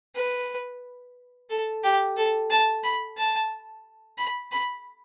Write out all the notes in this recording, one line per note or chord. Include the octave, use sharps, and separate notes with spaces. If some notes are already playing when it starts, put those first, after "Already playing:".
B4
A4
G4
A4
A5
B5
A5
B5
B5